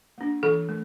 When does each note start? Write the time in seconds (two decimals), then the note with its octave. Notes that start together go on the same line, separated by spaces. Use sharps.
0.18 A#3 D4
0.43 E3 A4
0.69 A3